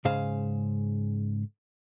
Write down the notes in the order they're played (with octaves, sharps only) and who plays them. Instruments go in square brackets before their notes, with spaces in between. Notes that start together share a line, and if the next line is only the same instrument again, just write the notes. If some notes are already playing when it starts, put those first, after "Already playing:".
[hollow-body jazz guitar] G#2 C#3 G#4 C5 F5